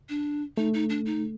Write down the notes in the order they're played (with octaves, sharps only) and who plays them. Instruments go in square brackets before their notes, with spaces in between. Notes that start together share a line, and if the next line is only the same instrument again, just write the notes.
[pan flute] D4
[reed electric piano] A3 [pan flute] D#4
[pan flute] D#4
D4
D#4